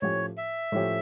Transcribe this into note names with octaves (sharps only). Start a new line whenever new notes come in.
A2 F3 C#4 G4 C#5
E5
A2 F3 C#4 G4